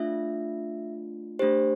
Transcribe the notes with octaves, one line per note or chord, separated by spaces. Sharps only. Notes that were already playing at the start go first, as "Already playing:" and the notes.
Already playing: A3 D4 F4 E5
A3 D4 G4 C5